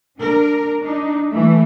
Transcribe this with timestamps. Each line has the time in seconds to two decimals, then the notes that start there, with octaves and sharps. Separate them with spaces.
0.19 D4 A#4
0.81 D4 D#4
1.31 E3 A3